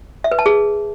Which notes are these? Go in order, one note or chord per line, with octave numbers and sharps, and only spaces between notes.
E5
B4
A5
G#4